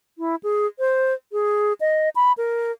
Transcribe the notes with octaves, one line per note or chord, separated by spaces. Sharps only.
E4
G#4
C5
G#4
D#5
B5
A#4